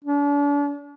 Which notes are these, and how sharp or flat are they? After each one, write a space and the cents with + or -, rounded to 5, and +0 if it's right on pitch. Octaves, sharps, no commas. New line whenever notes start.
D4 -40